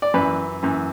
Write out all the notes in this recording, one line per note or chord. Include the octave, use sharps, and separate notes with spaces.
D5
F#2 E3 B4
F#2 E3